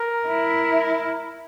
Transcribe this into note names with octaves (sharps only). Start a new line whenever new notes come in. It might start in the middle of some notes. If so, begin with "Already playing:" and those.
Already playing: A#4
E4